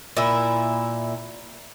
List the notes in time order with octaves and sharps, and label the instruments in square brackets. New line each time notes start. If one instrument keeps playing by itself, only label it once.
[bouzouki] A#2 E4